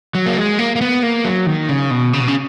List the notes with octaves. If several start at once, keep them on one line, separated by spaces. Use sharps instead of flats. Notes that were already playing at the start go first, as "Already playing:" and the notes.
F#3
A#3
G#3
A#3
A#3
B3
A#3
F#3
D#3
C#3
B2
C#3
B2
C#3